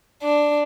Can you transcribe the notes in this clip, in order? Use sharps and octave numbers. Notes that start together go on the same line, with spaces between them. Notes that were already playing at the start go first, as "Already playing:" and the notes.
D4